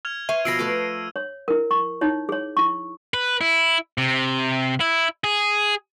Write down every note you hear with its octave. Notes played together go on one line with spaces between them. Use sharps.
F6 G#6 F7
C5 C#5 E5 D#7
B2 F3 B5 E6 A#6 C7 D7
A3 B4 D6
C#5
E4 A#4
C#6
D#4 E4 C#5
G#4 C#5
E4 C#6
B4
E4
C3
E4
G#4